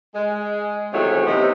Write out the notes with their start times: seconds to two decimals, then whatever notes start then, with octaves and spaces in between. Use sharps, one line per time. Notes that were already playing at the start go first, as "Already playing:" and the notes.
0.15 G#3
0.93 E2 A2 C3 D#3 F#3
1.26 C3 B3 C4 D#4